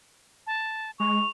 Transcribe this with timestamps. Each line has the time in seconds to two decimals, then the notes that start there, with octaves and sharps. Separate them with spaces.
0.47 A5
1.00 G#3 C#6 F7